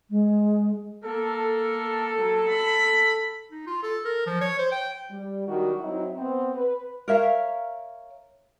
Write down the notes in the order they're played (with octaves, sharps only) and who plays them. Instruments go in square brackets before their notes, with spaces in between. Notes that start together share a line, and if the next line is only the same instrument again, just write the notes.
[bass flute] G#3
[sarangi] A#3 [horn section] A4
[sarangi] F#3
B5
[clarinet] D#4
F4
A4
A#4
F3
C#5
C5
G5
[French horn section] G3
D#3 F#3 G3 D4 F#4
F#3 C4 D#4 E4
B3 C4
B4
[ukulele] A#4 C#5 E5 F5